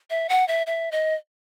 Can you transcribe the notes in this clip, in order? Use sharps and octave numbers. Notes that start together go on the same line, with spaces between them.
E5
F#5
E5
E5
D#5